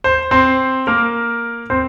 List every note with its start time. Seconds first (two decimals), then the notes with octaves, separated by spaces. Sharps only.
0.04 C5
0.31 C4 C5
0.87 A#3 A#4
1.70 C4 C5